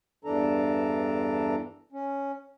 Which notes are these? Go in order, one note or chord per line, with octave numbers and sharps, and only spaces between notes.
E2 G2 E3 D4 A4 A#5
C#4